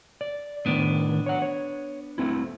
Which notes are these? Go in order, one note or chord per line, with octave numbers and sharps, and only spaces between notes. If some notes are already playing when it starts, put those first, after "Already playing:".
D5
A2 D#3 B3 D4
C#5 F#5
C#5
A3 C4 E4